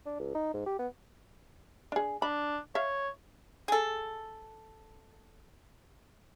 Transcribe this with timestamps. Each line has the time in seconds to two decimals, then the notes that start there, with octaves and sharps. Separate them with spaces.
0.06 D4
0.19 C#2
0.35 D#4
0.54 G#2
0.66 G4
0.79 B3
1.92 D4 G#4
2.22 D4 B5
2.75 C#5 E5 F5
3.68 G#4 A4